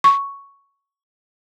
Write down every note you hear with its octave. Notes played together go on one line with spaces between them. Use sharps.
C#6